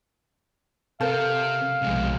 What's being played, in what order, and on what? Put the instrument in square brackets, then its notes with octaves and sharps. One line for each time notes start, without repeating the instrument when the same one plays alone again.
[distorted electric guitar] C3 [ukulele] A4 A#4 C5 [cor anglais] F5
[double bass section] B1 G#3 [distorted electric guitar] F2 C3